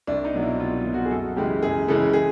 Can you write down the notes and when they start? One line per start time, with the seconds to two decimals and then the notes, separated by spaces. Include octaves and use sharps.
0.07 C2 D4
0.25 D#4
0.33 B2 F#3
0.42 E4
0.60 C2 F4
0.77 F4
0.85 B2 F#3
0.94 F#4
1.05 G#4
1.11 F#2 A4
1.36 C#3 E3 G#3 G4
1.62 F#2 G#4
1.88 C#3 E3 G#3 A4
2.13 G#4